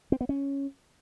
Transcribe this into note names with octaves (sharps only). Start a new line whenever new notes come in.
C4
B3
C#4